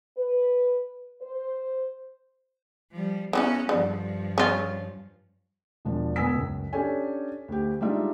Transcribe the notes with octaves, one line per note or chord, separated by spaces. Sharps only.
B4
C5
F3 G3
E3 G3 B3 C#4 F#4
G2 D3 F3
C#4 F4
E1 F3 D4
E1 B3 G#5 D#6 E6 B6
C#2 F#2
C#4 D4 G4 A4 C#5 G#5
D2 G4
G3 G#3 D4 D#4 F4 E5